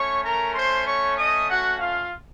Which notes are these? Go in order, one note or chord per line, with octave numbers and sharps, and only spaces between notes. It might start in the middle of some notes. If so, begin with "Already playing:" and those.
Already playing: A3 C#4 C#5 C#6
A#4 A#5
C5 C6
C#5 C#6
D#5 D#6
F#4 F#5
F4 F5